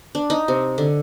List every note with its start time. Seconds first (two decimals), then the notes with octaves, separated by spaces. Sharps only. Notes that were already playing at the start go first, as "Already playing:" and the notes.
0.15 D4
0.30 D#4
0.48 C3
0.78 D3